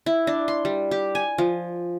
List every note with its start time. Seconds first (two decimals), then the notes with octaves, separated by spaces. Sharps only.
0.06 E4
0.27 D4
0.48 C6
0.65 G3
0.91 G4
1.15 G#5
1.38 F3